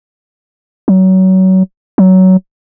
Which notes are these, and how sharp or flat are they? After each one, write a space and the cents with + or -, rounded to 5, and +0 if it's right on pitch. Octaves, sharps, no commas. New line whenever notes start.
F#3 +25
F#3 +15